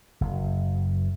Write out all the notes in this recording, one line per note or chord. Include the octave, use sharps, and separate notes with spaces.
F#1